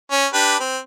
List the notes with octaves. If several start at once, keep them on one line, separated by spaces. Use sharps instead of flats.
C#4
D4 G4 B4
C4